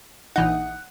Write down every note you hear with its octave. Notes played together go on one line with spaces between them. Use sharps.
A#1 E3 D#4 F#5